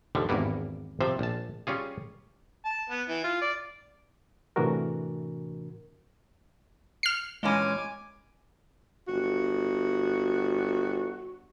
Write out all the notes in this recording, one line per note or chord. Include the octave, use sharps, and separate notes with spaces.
D#2 D3 F3 G3
G#1 E2 G2 A#3 B3
C3 F3 C5
A#1 A5
G3 C#4 F4 G#4
A5
B3
E3
F4
D5
A2 C3 E3 D4 F#4 A#4
F6 C7
A#2 E3 G#3 C#4 G#5 D6
G1 F#4